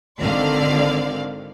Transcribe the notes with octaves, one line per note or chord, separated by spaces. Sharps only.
G#1 D3 D#3 C5 D5 F5